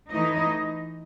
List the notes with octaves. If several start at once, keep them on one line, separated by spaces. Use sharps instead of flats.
E3 A3 D#4 E4 D#5